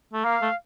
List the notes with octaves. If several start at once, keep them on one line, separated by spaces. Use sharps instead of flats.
A3
A#3 F5
A3